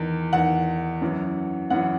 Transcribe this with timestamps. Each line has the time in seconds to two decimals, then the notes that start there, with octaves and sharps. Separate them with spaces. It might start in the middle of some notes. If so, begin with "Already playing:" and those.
Already playing: E2 D#3
0.33 E2 D#3 F#5
1.01 F#2 E3
1.70 F#2 E3 F#5